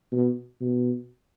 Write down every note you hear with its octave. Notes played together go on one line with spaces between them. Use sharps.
B2
B2